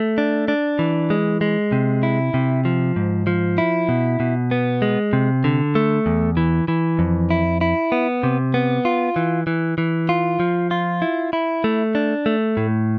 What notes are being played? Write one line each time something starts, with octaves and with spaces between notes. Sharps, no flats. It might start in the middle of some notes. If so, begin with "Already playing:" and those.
Already playing: A3
D4
D4
E3
G#3
G#3
C3
E4
C3
F3
G#2
F3
E4
B2
B2
B3
G#3
C3
D3
A3
E2
E3
E3
F2
E4
E4
B3
C3
B3
F4
E3
E3
E3
F4
F3
F4
E4
E4
A3
D4
A3
A2